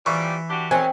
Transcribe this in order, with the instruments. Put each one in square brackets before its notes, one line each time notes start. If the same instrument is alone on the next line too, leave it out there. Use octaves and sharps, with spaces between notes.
[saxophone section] A#2 F3 G3 [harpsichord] E3 [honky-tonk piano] C#6
[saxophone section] D4 F#4 G4
[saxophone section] B2 D#3 F#3 [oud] C4 [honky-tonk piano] G#5